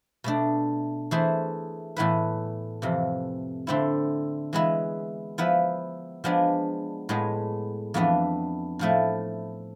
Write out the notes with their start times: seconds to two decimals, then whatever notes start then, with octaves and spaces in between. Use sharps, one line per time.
0.24 B2 A3 D4
1.11 E3 A3 E4 G#4 C5
1.96 A2 E3 B3 E4 B4
2.82 F2 C3 E3
3.67 D3 A3 C4 E4
4.53 E3 G#3 B3 E4
5.38 F3 B3 E4 B4
6.24 F3 G#3 B3 D4
7.09 A2 G#3 B3
7.94 F2 E3 B3 D4
8.79 A2 F3 A3 E4